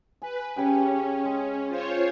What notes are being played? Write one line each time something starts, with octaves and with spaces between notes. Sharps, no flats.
B4 G#5
C#3 C#4 G4 G5
G#3
F4 C5 C#5